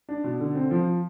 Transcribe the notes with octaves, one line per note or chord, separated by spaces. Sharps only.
D4
B2
D3
C4
F3